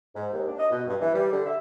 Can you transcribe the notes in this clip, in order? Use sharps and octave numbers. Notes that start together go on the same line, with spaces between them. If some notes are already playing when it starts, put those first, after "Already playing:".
G#2
D#2
D4
D#5
B2
G2
E3
G3
D3
E5